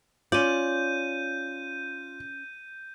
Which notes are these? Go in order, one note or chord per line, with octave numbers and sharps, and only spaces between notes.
C#4 F4 D5 G6 D#7